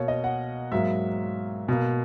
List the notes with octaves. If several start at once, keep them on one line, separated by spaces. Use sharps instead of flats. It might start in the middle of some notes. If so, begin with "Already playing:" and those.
Already playing: B2 A#3 C#5
D#5
F#5
G#2 F#3 A#3 E5
B2 A#3